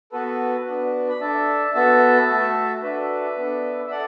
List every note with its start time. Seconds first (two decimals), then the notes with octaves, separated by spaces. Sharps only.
0.12 B3 F#4 A4 B4
0.66 B3 D4 F#4
1.09 B5
1.21 D4 A4 E5 A5
1.74 B3 F#4 A4 E5 A5
2.29 A3 F#4 A4
2.83 D4 F#4 A4 B4 E5
3.37 B3 D4 A4
3.87 E5
3.91 A4 D5 F#5